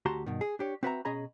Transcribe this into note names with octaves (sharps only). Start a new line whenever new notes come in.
D2 F#4 G4 A5 A#5 C6
G2 B2 D#3
G#4
D4 G4 C#5
C4 F#4 B4 D5 E5 A#5
B2 C#4 G#4 D#5 A#5 B5